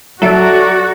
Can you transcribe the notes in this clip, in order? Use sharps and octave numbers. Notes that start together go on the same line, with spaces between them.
F#3 F#4 A4 D5 E5 D7